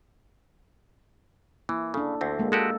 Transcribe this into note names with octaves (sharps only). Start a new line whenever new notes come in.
E3 A#3 E4
C#3 D4 A4
D2 C4
G#3 A#3
G#3 F#4 G4 A4